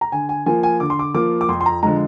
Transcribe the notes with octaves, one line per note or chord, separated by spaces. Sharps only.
A#5
D3 G#5
G#5
F3 A#3 F4 G#5
G#5
D3 D6
C6
D6
F3 A#3 F4 D6
D6
F2 C6
C6
A#5
D3 F3 G#3 A#5